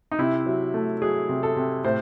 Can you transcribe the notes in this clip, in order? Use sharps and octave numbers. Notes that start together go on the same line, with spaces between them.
D#4
C3 E4
F#3
A3
F#3 G#4
C3
A4
C3
A2 C5